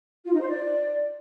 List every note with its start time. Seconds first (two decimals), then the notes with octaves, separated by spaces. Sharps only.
0.25 F4
0.32 D#4
0.40 C5
0.48 D5